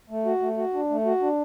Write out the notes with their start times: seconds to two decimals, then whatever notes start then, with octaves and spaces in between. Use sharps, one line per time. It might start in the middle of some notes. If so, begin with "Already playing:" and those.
0.10 A3
0.26 F#4
0.41 A3
0.57 F#4
0.74 D4
0.90 A3
1.05 F#4
1.21 D4